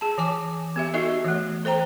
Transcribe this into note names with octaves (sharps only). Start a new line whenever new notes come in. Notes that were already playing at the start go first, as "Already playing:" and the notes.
G#4 A5
E3 G#5 D6
B3 G4 E5
D#4 F#4 A4 D#5 E5
E3 A3
A4 C5 G5 A#5